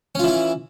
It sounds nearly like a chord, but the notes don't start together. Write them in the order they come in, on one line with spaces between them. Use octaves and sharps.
C#4 F4 E3 E4